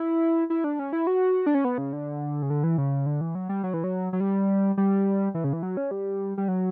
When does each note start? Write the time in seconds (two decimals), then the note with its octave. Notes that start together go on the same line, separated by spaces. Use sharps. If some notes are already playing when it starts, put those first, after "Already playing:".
Already playing: E4
0.50 E4
0.64 D4
0.79 C#4
0.93 E4
1.07 F#4
1.46 D4
1.55 C#4
1.65 B3
1.78 C#3
1.93 D3
2.42 C#3
2.50 D3
2.64 E3
2.78 C#3
3.06 D3
3.21 E3
3.35 F#3
3.49 G3
3.64 F#3
3.74 E3
3.84 F#3
4.13 F#3
4.20 G3
4.77 G3
5.35 E3
5.44 C#3
5.53 E3
5.63 F#3
5.77 C#4
5.91 G3
6.38 G3
6.48 F#3